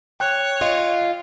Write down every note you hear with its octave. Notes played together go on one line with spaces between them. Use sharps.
C#5 G5 F#6
F4 D#5